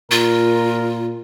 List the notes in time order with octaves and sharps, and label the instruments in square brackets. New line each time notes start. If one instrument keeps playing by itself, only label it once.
[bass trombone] A#2 [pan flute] F4 [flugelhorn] A#4